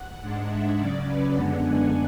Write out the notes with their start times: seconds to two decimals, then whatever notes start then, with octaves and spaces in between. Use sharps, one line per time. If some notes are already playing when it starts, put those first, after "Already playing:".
Already playing: F#5
0.21 G#2 G#3 D4
0.49 E5
0.78 C#3 F#3 C#4 D5
1.05 B4
1.34 F#2 D3 G#3 B3 D4 F#5
1.62 G#5